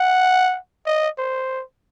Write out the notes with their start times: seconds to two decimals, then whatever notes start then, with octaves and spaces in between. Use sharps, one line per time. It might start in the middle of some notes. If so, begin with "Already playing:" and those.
Already playing: F#5
0.86 D#5
1.18 C5